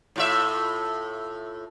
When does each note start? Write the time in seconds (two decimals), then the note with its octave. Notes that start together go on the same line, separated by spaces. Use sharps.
0.16 A2 F4 E5